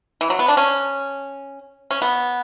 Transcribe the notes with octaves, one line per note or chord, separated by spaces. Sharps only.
E3
F#3
B3
D4
C#4
C#4
B3